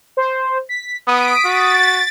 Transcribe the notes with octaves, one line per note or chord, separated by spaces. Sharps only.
C5
B6
B3 D#6 B6 D7
F#4 A6